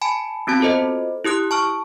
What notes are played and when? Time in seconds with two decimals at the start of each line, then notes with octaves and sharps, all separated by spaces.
0.02 G#5 A5 B5
0.47 B3 C4 F#4 A5
0.60 F4 F#4 A4 C5 D#5
1.24 E4 G4 D#6 F#6
1.51 A5 C#6 F6